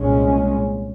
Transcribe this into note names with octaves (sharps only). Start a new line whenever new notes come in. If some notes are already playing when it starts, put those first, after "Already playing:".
Already playing: C2 A#2 G#3 C#4